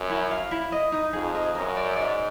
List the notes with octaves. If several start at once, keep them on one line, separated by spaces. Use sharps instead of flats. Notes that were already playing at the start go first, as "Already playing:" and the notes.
Already playing: F#2
E4
F5
E4
D#5
D#4
F2 G#4
D#5
F#2 A#4
D5
G#2 D5